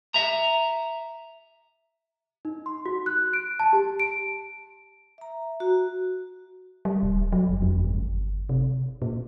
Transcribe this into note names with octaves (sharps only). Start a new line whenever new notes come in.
E5 A#5
D#4
C6
F#4
F#6
D7
A5
G4
D7
E5 A#5
F#4
G3
D#1
F#3
F#1
F2
G1
C3
A#2